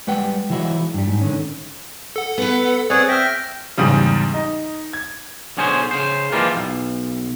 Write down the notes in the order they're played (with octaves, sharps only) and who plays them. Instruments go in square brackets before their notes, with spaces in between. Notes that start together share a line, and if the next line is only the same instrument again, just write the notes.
[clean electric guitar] G3 G#3 B4 F#5 G5
E3 F#3 G#3 E4 F#4
G2 G3
G#2
D3 D#3 C#4
[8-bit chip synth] A4 F#5
[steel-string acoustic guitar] B3 B4
[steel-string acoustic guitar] C4 [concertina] G#4 C#5 F#5 [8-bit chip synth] B4 D5
[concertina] E5 G5 [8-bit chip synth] F6 A#6
[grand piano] E2 G#2 C#3 G3
D#4
G#6
[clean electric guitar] B1 D3 C#4 G#4 A4 C5
C#3 C5
E3 F3 G3 G#3 A#3 F4
B1